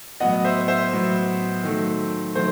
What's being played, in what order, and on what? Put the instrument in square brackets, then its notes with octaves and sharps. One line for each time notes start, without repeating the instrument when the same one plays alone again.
[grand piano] A2 F#3 B3 D#5 F#5
C5 E5
C5 E5
A2 F#3 B3
D#3 F#3 A3
D#3 F#3 A3 C5